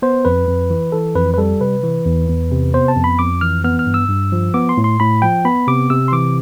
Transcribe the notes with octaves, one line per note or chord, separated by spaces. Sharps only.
B3 C5
F2 B4
F2
E3
E3 A4
F2 B4
B4
G3 A4
C3 B4
E3
E2
E2
C3
B3 C5
A5
F2
B5
F2 D6
E3 F6
B3 F6
F6
G2
E6
G2
F3
B3 D6
C6
A2
C6
A2 B5
F3 G5
B3 B5
C3 D6
C3 E6
C6
E3 D6